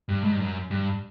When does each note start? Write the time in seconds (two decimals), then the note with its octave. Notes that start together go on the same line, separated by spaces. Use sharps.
0.09 G2
0.24 G#2
0.34 G2
0.40 F#2
0.71 G2